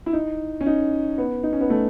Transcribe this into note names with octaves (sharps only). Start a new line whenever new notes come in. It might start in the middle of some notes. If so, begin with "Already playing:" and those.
E4
D#4
C#4
D#4
B3
D#4
C#4
B3
A3